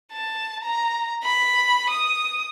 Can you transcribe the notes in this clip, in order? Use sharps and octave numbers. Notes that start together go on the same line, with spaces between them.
A5
A#5
B5
D#6